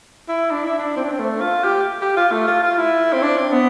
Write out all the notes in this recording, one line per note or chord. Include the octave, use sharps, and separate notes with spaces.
E4
D4
E4
D4
C4
D4
C4
A3
F4
G4
G4
F4
A3
F4
F4
E4
C4
D4
C4
B3